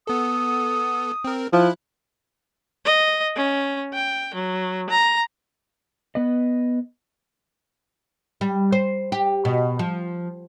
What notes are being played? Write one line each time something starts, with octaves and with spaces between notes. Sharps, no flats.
B3 A4 D#6
C4 A#4
F3 E4 F#6
D#5
C#4
G5
F#3
A#5
B3 B4 D#5
G3
C5
G4
B2
F3